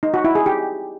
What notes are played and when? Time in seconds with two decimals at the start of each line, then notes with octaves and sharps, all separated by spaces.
0.03 D#4
0.14 F#4
0.25 E4
0.35 G#4
0.46 G4